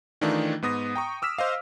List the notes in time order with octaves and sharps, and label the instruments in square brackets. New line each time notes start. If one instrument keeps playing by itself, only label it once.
[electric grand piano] D#3 E3 A3 D4 D#4 F4
G#2 B3 D#6 A#6
G5 A#5 C#6
D6 E6 F6 B6 E7
C5 D#5 F5